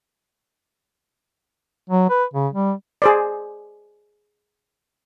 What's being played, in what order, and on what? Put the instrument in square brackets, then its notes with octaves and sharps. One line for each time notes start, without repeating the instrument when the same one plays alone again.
[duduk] F#3
B4
C#3
G3
[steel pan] G#4 C5 D5